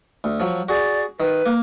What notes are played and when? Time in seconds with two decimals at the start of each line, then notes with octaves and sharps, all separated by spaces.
0.24 D2
0.40 F3 F#3
0.69 F#4 G#4 D5
1.20 D#3 B4
1.46 A#3